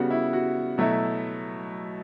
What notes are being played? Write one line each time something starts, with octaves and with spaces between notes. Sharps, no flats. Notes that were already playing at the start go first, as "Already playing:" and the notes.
Already playing: C#3 G3 B3 F#4
E4
F#4
B2 F#3 A3 E4